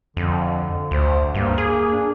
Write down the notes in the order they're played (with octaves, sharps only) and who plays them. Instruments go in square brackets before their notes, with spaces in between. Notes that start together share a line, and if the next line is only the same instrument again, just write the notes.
[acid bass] F2 [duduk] D3
[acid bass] D2 [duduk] C5
[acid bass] G2 [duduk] A#3
[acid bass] G#4
[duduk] D4